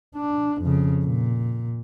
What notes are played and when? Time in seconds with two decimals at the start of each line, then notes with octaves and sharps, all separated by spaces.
0.16 D4
0.61 F2 C#3
1.05 A#2